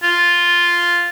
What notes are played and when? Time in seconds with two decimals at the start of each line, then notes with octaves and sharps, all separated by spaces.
0.03 F4